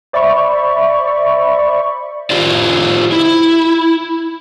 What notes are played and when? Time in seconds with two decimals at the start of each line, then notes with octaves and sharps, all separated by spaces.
0.13 C5 D5 E5 B5 C#6
2.30 F4 G4 C5 D5
3.12 E4